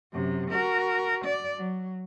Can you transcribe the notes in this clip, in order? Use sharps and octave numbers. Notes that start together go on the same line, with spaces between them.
F#2 C3
F#4 A#4
D5
F#3